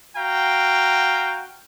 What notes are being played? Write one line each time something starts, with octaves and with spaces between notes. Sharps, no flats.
F#4 F5 G5 A#5